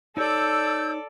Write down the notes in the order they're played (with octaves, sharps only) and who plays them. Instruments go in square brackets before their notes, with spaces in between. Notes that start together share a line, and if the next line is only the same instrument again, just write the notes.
[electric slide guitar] D#4 C#5 [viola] A4 D5 [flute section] E6 G6